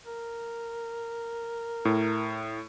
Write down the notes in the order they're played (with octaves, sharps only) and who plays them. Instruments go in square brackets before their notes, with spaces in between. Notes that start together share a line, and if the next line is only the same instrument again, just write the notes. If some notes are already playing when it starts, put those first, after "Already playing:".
[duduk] A#4
[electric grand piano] A2